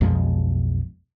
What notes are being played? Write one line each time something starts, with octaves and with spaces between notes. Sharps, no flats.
B1 F2 F3 G#3